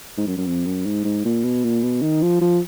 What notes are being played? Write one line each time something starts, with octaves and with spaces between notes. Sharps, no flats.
G#2
F#2
F#2
F2
F#2
G#2
G#2
A#2
B2
A#2
B2
D#3
F3
F3